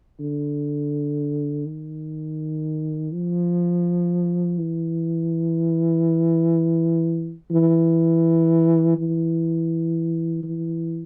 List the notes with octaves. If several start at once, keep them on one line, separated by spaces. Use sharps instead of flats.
D3
D#3
F3
E3
E3
E3
E3